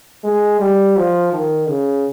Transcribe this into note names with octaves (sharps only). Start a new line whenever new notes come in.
G#3
G3
F3
D#3
C#3